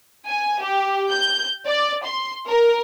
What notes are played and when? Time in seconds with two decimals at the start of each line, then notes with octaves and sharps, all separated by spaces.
0.27 G#5
0.62 G4
1.12 G6
1.66 D5
2.04 C6
2.47 A#4